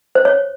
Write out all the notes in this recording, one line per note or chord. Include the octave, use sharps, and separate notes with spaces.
C5
C#5